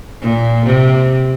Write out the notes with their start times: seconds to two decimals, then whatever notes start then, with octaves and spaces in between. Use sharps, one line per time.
0.22 A#2
0.66 C3